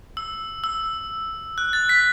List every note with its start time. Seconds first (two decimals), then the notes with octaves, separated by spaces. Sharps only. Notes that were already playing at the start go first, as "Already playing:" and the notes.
0.17 E6
0.64 E6
1.58 F#6
1.73 A6
1.89 B6